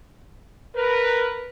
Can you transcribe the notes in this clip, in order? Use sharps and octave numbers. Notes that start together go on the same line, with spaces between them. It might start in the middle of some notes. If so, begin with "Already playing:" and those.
A#4 B4